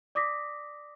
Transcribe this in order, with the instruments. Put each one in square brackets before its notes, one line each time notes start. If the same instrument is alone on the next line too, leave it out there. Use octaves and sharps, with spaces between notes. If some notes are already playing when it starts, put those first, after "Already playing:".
[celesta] D5 D6 D#6 A#6 B6